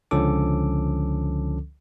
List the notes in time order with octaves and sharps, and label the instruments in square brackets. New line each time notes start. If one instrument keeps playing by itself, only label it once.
[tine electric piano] C#2 D3 F3 C#4 A4 D6